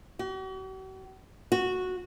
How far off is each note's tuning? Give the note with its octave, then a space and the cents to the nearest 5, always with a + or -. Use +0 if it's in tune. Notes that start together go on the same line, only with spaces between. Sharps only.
F#4 +45
F#4 -10